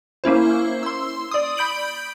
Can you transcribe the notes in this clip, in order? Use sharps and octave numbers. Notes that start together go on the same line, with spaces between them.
A#3 C#4 E4 C5
C6 E6
D5 D#6
B5 G6 D7 F#7